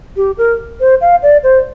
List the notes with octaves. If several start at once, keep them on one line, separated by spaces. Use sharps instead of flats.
G4
A#4
C5
F5
D5
C5